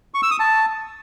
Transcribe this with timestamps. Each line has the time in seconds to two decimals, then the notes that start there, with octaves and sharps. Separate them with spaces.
0.14 C#6
0.23 E6
0.31 D#6
0.39 A5